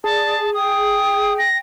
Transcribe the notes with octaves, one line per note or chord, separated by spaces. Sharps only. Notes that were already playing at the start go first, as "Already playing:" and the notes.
G#4 D5 A5
G5 D#6
A#6